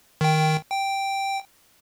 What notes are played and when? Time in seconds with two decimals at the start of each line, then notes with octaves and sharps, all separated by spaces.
0.21 D#3 G5
0.72 G5